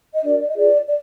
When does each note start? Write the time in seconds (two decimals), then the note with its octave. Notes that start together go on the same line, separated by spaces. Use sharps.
0.13 D#5
0.24 D4 F#4 A#4 D5
0.39 D5
0.48 D#5
0.55 F4 G#4 B4 D5
0.87 D5